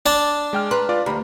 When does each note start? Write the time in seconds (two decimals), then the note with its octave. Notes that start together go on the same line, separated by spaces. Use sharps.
0.06 D4 A5
0.53 G#3 G5 F6
0.71 B4 A#5 C6
0.89 F4 D5 D6
1.06 D2 G4 A#5 B5